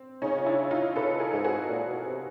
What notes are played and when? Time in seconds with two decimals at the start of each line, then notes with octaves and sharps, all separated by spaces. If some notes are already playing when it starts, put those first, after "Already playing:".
Already playing: C4
0.22 C#3 C#4 D#4
0.38 F4
0.46 D4 E4
0.71 D#4 F4
0.96 C#3 A4 B4
1.20 G#4 A#4
1.33 G#2 A4
1.44 F#4 G#4
1.69 A#2
1.87 B2
2.06 C3